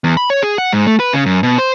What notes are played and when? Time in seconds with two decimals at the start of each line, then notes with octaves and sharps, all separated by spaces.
0.04 E2
0.17 B5
0.30 C#5
0.42 G#4
0.58 F#5
0.72 G#2
0.87 A3
1.00 B4
1.14 C#3
1.26 F#2
1.43 B2
1.58 C5